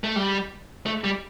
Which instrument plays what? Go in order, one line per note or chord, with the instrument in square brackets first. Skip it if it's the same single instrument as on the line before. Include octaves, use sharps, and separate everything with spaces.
[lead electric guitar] A3
G3
A3
G3